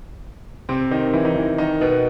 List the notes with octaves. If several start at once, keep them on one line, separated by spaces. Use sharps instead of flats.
C3 C4
D#3 D#4
E3 E4
D#4
E3 E4
D#3 D#4
B2 B3